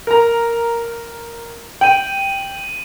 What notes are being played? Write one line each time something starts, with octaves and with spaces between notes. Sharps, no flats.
A#4 A#5
G5 D#7 F#7